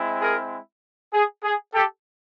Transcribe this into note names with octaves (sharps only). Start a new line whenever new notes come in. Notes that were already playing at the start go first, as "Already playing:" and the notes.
Already playing: G#3 C4 E4
G#4 A#4
G#4
G#4
G4 A4